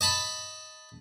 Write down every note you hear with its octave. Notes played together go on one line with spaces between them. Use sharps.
D#5 A5 B5